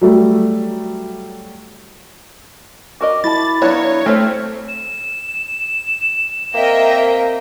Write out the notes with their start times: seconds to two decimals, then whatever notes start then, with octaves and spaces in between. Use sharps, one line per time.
0.01 F#3 G3 A3
3.01 F#4 A#4 D#5 D6
3.24 E4 A5 B5 A6
3.62 F#3 B3 D4 E4 C#5 F5
4.06 A3 C4 G4 C5 C#5 A5 F6
4.69 E7
6.54 A#3 C4 A#4 D#5 E5 G5